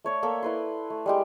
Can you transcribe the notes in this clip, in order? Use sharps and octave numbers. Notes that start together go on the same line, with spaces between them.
A3 C#5 D5
A#3 A4 E5
E4 B4 C6
A3
G3 G#3 G4